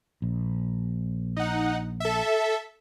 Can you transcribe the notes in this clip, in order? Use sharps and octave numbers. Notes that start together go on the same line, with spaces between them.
A#1
D#4 F#5
A4 E5